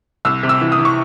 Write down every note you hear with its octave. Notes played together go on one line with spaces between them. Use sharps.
C2 E6
C3
E6
E3
D#6
E3
C#6